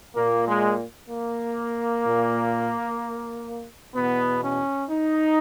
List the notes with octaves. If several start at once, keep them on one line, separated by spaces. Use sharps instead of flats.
A#2 A#3
G#3
A#3
A#2
E2 B2 B3
C#4
D#4